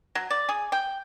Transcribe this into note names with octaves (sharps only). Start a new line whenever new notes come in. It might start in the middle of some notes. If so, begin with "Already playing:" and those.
F#3
D5
G#4
G5